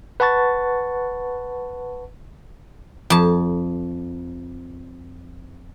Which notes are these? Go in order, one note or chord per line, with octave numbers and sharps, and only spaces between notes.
B4 F#5 A5 C#6 A6
F2 A5